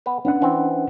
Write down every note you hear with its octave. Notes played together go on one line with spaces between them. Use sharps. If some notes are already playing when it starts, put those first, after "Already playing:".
B3 B4
B3 C#4 D4 F#5
E3 C4